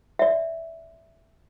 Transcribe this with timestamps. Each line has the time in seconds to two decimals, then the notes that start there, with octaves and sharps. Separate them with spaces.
0.19 D5 E5